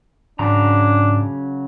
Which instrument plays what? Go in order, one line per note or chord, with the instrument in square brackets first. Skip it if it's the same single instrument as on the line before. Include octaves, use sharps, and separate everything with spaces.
[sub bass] G#2 [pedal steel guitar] C#3 F#3 A#5 [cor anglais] D4